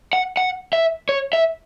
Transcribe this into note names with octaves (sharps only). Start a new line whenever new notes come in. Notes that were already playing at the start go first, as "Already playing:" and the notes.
F#5
F#5
E5
C#5
E5